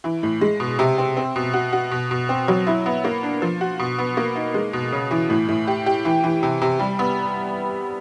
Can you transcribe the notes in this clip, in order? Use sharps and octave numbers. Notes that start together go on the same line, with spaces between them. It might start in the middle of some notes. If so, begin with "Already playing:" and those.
E3
A2
G#3
B2
C3
C4
C4
B2
F#4
F#4
B2
B2
C4
F#3
E4
B3
A#3
D4
F3
F#4
B2
B3
A#3
D#4
G#3
B2
C#3
E3
A2
A2
G4
G4
E3
E3
C3
C3
G3
B3